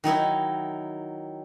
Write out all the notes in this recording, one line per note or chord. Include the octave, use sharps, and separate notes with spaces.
D#3 F#3 D#4 E4